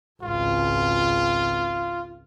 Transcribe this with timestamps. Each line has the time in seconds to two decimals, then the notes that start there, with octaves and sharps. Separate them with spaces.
0.22 G#1 C#2 F4